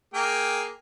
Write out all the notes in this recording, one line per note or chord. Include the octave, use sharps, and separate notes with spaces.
A#3 G#4 G5